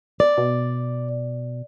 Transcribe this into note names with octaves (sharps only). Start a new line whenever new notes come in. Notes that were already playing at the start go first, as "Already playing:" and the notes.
D5
B2